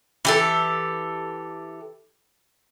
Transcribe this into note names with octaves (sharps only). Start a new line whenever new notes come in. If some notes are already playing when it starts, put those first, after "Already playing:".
E3 G4 A4